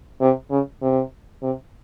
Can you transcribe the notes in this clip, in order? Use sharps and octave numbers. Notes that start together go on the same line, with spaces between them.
C3
C#3
C3
C3